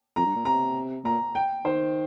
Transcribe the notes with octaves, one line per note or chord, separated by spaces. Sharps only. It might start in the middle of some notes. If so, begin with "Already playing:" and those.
F2 A#5
G2
A#2
C3 A#5
A#2 A#5
G5
D#3 C5